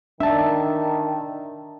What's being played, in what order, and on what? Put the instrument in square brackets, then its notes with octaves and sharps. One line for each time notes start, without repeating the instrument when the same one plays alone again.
[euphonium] D#3 [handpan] D4 [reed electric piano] E5 A5